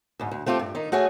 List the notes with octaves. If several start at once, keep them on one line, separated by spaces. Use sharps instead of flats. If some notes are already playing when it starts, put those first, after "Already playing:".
D2 G#2
D2
A3 C4 F4 G4 A4
G2
D#3 D#4
A3 F#4 G#4 C#5 D#5